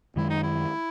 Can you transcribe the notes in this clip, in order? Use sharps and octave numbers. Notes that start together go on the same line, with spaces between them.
F#2 D#3 G#3 E4
D#4
E4